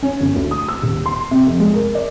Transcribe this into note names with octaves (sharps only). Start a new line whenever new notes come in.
C#4
G1
D2
D#6
E6
D#1
C6
C3
F1
G#3
A#4
D5